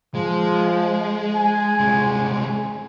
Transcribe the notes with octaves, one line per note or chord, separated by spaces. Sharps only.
F3 G#3
G#5
C2 G#3